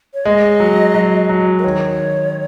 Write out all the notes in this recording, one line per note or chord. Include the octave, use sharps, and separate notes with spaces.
C#5
G#3 D#5
F#3
F#3
F#3
A#4
D#3 C#5